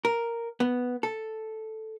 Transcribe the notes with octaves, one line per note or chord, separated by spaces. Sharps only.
A#4
B3
A4